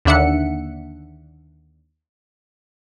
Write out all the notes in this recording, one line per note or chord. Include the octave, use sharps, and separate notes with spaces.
D#2 D3 D4 E5 F#5 C#7